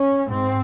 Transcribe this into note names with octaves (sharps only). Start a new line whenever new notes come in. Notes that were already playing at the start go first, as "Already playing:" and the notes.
Already playing: C#4
G#2 C4